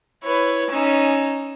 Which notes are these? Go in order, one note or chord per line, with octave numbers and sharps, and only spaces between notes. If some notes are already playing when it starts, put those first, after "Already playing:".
E4 B4 C#5
C#4 D#4 E6